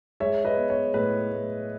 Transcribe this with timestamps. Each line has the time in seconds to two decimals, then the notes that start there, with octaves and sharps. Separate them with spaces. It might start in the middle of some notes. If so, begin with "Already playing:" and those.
0.20 G#3 C#5 E5
0.45 B4 D#5
0.57 B3
0.70 C#5
0.94 A2 B4
1.31 A2